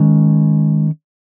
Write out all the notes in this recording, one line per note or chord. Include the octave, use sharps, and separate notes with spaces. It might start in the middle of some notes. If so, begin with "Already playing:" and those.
Already playing: D#3 G#3 C#4